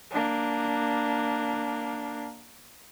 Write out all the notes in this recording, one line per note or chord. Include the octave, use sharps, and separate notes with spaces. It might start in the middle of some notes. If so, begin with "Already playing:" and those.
A#3 D4